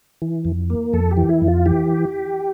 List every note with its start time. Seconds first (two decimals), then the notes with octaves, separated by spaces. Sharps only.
0.22 E3
0.45 F2
0.70 A#3
0.93 F2 A4
1.11 G4
1.17 E3
1.29 E4
1.42 F2
1.48 F4
1.66 E3 G4